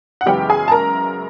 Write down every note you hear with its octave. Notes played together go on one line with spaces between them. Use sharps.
F#5
F#2 C#3 E3 G#3 B3 G4 G5
G#4 G#5
A5
A#4 A#5